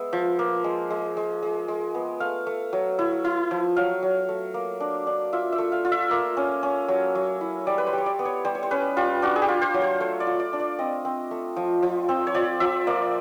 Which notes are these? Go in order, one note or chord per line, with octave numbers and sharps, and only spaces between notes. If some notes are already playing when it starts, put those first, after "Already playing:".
Already playing: G#3 B3 E5
F3
A#3
G#3
G#3
G#3
G#3
G#3
B3
A3 F5
A3
F#3
E4
E4
F3
F#3 F5
F#3
A3
A#3
D4
D4
F4 E5
E5
A3
F5
F4
E5
A#3
C#4
C#4
F#3
F#3
E4
G3 D5
B4
C5
G3
C#5
D5
B3
C#5
G3 C5
C#5
C5
C#4 B4
G3 F4
D4 F#4
G#4
G4
F4
C5
F#3
C5
A3 C#5
D5
F4
D5
D4
D5
C4 D#5
C4
A3
F3
F3
C4
C#5
F3 D5
F3 E5
A#3 D5